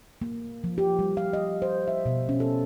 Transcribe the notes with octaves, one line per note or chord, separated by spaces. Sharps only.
A#3
F3
G4
G3
F5
D#5
C5
E5
B2
C#4
A4